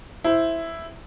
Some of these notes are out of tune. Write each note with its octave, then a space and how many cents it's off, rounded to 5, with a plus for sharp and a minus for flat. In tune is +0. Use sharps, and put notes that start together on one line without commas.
E4 +0 C5 +0